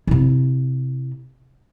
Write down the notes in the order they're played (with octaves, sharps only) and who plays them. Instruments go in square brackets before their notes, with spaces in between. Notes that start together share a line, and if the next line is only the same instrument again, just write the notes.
[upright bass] C3 E4